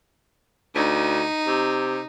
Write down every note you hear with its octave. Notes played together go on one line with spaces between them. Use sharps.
D2 D#4
C3